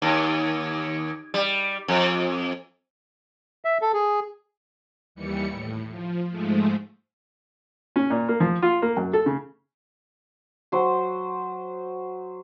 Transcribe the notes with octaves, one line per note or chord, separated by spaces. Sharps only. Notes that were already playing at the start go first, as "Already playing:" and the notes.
D#2
G3
F2
E5
A4
G#4
D#2 E3 G3 C#7
A2
F3
G#2 F3 G#3 A3
C#4
A#2
A#3
F3
F4
A#3
F#2
A4
C#3
F#3 C5